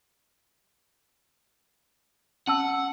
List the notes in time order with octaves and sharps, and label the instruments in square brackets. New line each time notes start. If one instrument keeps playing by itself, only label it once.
[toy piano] C#4 A5 E6 [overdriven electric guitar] F#5